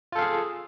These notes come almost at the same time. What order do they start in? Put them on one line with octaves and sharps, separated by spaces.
F4 A4 F5 G#4